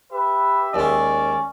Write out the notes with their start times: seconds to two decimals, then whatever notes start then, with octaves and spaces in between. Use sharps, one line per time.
0.12 G4 B4 E5
0.74 D#2 G#3 C#4 D5